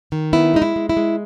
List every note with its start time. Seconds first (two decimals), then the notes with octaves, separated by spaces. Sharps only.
0.12 D#3
0.33 B3 E4
0.54 G#3 D#4
0.62 E4
0.76 G#3
0.89 E4
0.97 G#3